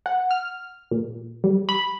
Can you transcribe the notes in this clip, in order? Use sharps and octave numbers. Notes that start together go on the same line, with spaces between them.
F#5
F6
A#2
G3
B5